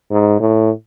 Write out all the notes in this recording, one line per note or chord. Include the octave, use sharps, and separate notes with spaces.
G#2
A2